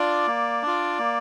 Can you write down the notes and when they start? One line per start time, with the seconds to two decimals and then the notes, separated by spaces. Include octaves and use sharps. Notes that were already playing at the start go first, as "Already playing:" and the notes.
Already playing: D4 F4 D5
0.27 A#3
0.62 D4 F4
0.99 A#3